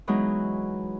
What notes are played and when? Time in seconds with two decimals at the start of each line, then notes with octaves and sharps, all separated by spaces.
0.07 E3 F#3 G#3 B3 D#4